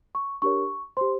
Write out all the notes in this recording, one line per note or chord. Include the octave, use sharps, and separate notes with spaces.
C#6
D4 G4 A#4 C#5 C#6
G4 C5 C6